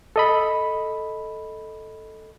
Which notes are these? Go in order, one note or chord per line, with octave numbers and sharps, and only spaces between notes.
A4 D#5 B5